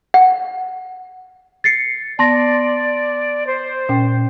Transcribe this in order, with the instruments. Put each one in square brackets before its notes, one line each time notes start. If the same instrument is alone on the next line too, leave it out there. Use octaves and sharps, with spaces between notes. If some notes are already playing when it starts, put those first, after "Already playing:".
[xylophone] F#5
[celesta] A6 C7 C#7
[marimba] B3 [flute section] D5 [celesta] A5 C6 A#6
[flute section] C5
[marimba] A#2 C#4 G5